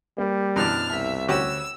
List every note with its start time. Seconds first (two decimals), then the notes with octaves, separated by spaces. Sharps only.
0.18 G3 A#3
0.56 F#2 B2 E3 D4 A5 F6
0.92 C2 E5
1.28 D2 C#4 F#4 G4 E6